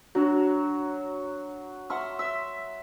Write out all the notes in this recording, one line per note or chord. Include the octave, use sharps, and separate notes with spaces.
F#3 D4 F#4
E5 F#5 C6 C#6 F6
E5 C6 E6